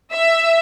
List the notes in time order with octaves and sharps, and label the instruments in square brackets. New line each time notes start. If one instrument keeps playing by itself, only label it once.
[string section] E5